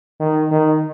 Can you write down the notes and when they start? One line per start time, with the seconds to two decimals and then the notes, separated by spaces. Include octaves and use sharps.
0.20 D#3
0.51 D#3